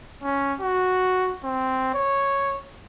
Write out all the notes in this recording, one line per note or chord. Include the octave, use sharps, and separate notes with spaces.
C#4
F#4
C4
C#5